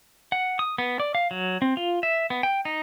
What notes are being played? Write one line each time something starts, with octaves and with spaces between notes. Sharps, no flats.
F#5
D#6
B3
D5
F5
F#3
C4
F4
E5
B3
G5
D#4